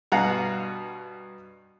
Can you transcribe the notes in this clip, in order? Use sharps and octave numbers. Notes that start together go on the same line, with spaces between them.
G2 B2 F5 F#5 A#5